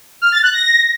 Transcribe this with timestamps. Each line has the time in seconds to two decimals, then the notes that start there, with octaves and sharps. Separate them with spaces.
0.22 F6
0.32 A6
0.43 F#6
0.53 A#6